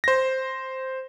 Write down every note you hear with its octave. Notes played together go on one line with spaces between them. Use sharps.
C5 A#6